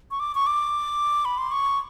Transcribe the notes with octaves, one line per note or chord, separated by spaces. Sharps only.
C#6
D6
C#6
D6
B5
C6
C#6